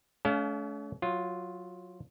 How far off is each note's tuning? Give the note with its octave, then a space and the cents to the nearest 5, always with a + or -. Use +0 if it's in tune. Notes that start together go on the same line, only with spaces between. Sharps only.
A3 -40 C#4 +35 F5 +5
F#3 -15 F4 +0